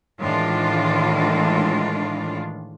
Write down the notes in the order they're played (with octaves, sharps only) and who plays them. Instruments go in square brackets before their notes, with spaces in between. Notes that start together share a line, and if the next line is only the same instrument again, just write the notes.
[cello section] A2 D#3 E3 G#3 D4 F4